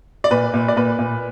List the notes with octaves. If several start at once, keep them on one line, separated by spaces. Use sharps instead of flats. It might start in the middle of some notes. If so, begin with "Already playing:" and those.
D5
A#2 B4
A#2
D5
A#2 B4
A#2